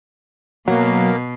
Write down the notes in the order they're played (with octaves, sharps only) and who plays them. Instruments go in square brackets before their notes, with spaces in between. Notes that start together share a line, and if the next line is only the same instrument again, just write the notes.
[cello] B2 [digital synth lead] F#3 [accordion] A#3